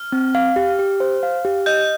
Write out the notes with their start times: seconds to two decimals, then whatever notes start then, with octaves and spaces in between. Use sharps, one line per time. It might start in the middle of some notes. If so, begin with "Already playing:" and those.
Already playing: F6
0.12 C4
0.35 F5
0.56 G4
0.79 G4
1.00 C5
1.23 F5
1.45 G4
1.66 D#5 G6